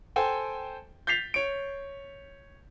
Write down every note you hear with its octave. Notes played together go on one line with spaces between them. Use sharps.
A4 C5 G5 G#5
G6 A6 B6 C7 F7
C#5 D7